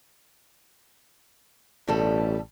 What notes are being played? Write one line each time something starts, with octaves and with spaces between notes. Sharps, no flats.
A1 B2 G3 A4